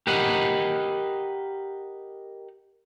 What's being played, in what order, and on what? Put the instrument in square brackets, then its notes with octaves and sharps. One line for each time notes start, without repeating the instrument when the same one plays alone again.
[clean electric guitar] G4 A#4 B4 D#5 F#5